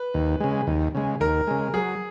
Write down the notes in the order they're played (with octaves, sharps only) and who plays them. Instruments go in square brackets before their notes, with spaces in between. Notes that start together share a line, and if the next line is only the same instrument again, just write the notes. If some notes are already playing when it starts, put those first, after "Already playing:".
Already playing: [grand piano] B4
[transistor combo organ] D#2
C#3 G#3
D#2
C#3 G#3
[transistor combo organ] D#2 [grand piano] A#4
[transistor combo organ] C#3 G#3
[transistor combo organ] F#3 [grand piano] G#4